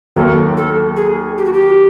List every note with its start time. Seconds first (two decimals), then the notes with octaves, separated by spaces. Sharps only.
0.16 D#2 D#3 F#3 A#3 A4
0.57 A4
0.96 G#4
1.38 G4
1.45 F#4
1.53 G4